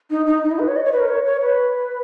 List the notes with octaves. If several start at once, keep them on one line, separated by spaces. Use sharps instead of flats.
D#4
D#4
D#4
E4
B4
C#5
D#5
C#5
B4
A#4
C#5
C#5
B4